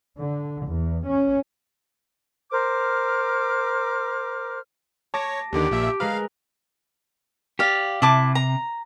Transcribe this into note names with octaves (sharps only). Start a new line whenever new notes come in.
D3
E2
C#4
A#4 C5 D6 F6
C#5 A5 D6 A#6
D#2 D3 D#3 G4
A#1 A#2 E5
G#3 A#4 B4 F5
G4 D5 F5
C3 E4 A5 D6
A#5